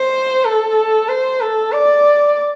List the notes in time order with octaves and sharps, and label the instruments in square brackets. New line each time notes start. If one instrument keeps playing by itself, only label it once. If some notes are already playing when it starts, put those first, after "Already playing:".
Already playing: [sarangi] C5
A4
C5
A4
D5